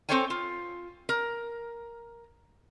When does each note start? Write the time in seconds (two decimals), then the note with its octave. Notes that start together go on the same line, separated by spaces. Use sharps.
0.09 C4 A4 C5 C#5 G5 G#5
0.30 F4
1.09 A#4